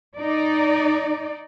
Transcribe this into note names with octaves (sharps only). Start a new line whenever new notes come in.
D#4 D5